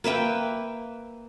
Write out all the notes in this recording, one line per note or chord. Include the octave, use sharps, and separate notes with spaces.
A#3 B4 E5 G5